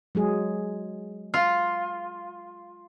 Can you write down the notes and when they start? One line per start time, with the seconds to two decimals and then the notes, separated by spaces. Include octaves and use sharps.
0.15 F#3 G#3 G#4
1.34 F4